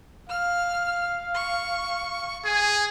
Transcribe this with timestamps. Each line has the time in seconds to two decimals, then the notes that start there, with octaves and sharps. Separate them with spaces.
0.29 F5 F6
1.34 C#6
2.45 G#4 G#5